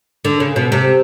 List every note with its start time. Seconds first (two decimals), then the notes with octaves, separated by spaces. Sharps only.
0.25 D3
0.40 C#3
0.56 B2
0.72 C3